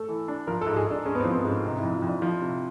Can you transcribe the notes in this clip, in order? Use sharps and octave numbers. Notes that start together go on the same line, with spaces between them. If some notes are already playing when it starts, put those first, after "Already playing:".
Already playing: A3 A4
E3
D4
F3 A#4
A4
G#2
G#4
G#2 D4
G#3 C#4
B3
F3 C4
B3
G#2
C#4
C3 D#4
F2 E4
F4
F2
D4
F3
C3